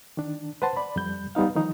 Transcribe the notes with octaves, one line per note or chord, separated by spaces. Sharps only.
D#3 D4
B4 C5 F#5 A5 C6
D5 B5
F2 G3 G6
G3 B3 D#4 F5
D#3 F3 D#4